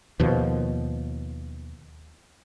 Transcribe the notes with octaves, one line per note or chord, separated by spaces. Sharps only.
D#2 B2 F3